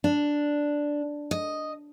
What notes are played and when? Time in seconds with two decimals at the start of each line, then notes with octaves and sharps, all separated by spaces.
0.04 D4
1.31 D#5